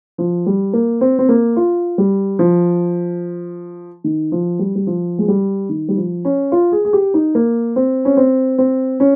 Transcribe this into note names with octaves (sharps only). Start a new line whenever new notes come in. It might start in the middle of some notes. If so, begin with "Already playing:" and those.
F3
G3
A#3
C4
C4
A#3
F4
G3
F3
D#3
F3
G3
G3
F3
G#3
G3
D#3
G3
F3
C#4
F4
G#4
G#4
G4
D#4
A#3
C4
C#4
C4
C4
C#4